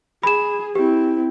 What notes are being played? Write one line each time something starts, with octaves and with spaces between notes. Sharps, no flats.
G#4 B5 E7
C4 E4 G4